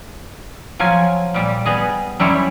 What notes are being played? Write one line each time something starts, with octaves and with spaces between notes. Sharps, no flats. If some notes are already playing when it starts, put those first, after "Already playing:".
F3 F#3 F4 F5 G#5
A#2 G3
G3 B3 G#4 D#5
F#2 G3 E4 C#5 C6